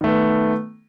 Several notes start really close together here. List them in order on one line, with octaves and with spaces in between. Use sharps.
D#3 A3 B3